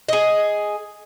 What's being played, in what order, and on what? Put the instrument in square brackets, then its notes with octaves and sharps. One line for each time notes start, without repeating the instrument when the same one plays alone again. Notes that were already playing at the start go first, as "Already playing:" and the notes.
[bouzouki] G#4 D#5